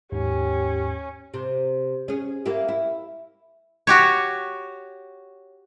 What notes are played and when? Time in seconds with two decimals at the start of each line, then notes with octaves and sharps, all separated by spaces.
0.12 D#2 G#2 C#4 G4
1.34 C3
2.08 C#4 G#4
2.46 A#3 E4 G4
2.68 E4
3.87 F#4 G4 C#5